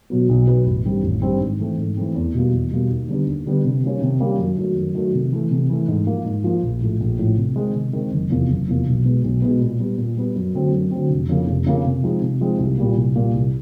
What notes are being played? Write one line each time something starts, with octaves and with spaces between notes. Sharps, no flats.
B2 F#3 B3
B1
B2 F#3 B3
A1
G2 D#3 G3 C4
A1
G2 D#3 G3 C4
G#2
E3 A3 C4
G#2
E3 A3 C4
E2
B2 G3 A#3
E2
B2 G3 A#3
D#2
D3 G3 B3 D4
D#2
D3 G3 B3 D4
C3
D#3 G3 A#3 C#4
C3
D#3 G3 A#3 C#4
F#2
D#3 F#3 A3
F#2
D#3 F#3 A3
C3
E3 A3
C3
E3 A3
G#2
F3 A#3
G#2
F3 A#3
A#1
A2 F3 A3
A#1
A2 F3 A3
C3
D#3 G#3 C4
C3
D#3 G#3 C4
F#1
E2 C3 F3 A#3
F#1
E2 C3 F3 A#3
B1
B2 G#3 B3
B1
B2 G#3 B3
A#2
G3 B3
A#2
G3 B3
F#2
D3 F#3 A3 C4
F#2
D3 F#3 A3 C4
F1
F2 C#3 F3 A#3
F1
F2 C#3 F3 A#3
C3
F3 G#3 C4 D#4
C3
F3 G#3 C4 D#4
C2
A#2 G3 A#3
C2
A#2 G3 A#3
C2